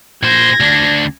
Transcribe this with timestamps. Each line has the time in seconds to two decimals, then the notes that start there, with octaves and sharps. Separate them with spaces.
0.23 A#2 C5 G#6 A#6
0.60 D2 D4